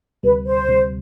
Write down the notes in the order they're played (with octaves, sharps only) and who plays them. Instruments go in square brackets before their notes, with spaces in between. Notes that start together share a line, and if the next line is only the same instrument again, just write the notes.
[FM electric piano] D2 C3 G3 [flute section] B4
[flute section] C5
[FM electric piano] D2 C3 G3